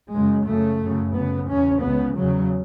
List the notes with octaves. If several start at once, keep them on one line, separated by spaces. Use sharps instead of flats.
F#2 C#3 G#3
F#2 C#3 A3
F#2 C#3
F#2 C#3 B3
E2 C#3 C#4
C#2 C#3 B3
E2 C#3 F#3